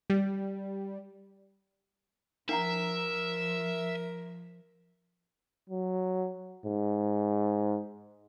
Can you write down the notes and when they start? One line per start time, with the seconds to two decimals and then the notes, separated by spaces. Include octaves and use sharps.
0.10 G3
2.49 F3 D4 A#4 E5 F#5 A#5
5.69 F#3
6.66 G#2